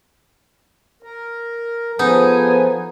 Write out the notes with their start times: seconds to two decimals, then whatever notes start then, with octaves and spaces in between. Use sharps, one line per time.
1.03 A#4
1.99 F3 B3 D#4 G#4 A4 G#5